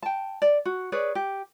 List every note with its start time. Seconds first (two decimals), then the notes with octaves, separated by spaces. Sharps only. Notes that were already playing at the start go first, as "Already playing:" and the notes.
0.03 G5 A5
0.42 D5
0.65 F#4
0.92 G#4 B4 C#5 D5
1.15 G4